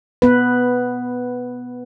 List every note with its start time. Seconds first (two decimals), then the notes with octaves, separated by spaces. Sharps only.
0.22 B3 B4